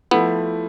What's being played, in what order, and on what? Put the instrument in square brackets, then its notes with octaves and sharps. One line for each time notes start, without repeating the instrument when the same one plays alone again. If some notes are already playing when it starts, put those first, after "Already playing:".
[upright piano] F3 A3 E4 [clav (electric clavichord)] B3